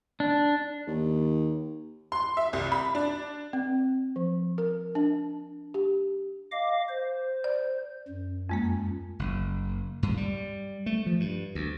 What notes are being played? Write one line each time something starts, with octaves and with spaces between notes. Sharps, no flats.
D4
D#2
C6
E5
C2
B5
D4
C4
F3
A#4
D4
G4
D#5 F5 D6
C5
D5
F#2
F2 G#3 A#3
F#1
G2
G3
A3
F3
G2
D2